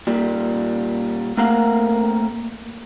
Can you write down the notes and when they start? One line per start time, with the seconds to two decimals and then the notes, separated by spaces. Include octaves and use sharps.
0.07 A#2 G3
1.37 A3 A#3 C4 A#4 F5 F#5